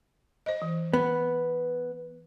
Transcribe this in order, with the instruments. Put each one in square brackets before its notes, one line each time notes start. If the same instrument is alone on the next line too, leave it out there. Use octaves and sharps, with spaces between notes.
[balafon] C5 D#5
E3
[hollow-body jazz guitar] B3